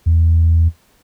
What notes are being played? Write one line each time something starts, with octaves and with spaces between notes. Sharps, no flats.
E2